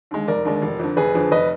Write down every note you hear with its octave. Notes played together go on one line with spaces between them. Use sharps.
D#2 D3 G#3
F1 A#4 D5
D#2 D3 G#3
F1
F2 D3
F1 G#4 B4
F2 D3
F1 B4 D#5